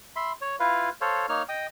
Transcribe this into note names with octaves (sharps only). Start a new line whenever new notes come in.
E5 B5 C6
C#5
E4 F4 B4 F5
A4 C5 C#5 F5
A#3 D#4 C#5 F6
D#5 G5 D#6